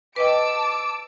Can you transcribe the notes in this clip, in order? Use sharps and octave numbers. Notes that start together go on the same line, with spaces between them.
B4 D#5 G5 A5 D6 E6 D7